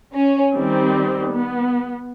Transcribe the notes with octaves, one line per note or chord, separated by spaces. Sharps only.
C#4
D#3 G3 C4
B3